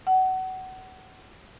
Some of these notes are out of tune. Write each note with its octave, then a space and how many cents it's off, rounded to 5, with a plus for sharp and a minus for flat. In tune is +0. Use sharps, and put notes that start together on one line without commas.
F#5 +25